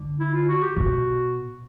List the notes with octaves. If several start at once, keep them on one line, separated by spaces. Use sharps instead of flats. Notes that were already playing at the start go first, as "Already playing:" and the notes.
Already playing: D3
E4
F4
F#4
G4
B2 F#4